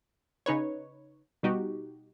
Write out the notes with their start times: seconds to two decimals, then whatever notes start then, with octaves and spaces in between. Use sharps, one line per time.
0.46 C#3 D#4 B4 C#5
1.43 B2 G3 D#4 F#4 G4